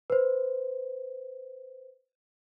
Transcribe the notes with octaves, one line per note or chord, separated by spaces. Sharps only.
B4 C5